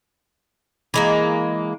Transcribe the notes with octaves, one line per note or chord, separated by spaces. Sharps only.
E3 G#3 A#3